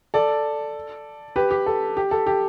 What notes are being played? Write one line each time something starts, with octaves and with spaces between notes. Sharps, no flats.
A4 D5
G4 B4
G4
A4
G4
A4
G4